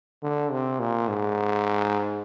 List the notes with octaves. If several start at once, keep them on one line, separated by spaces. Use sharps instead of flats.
D3
C3
A#2
G#2